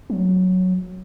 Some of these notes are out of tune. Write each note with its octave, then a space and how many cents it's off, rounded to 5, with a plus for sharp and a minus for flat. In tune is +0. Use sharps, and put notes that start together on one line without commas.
F#3 -5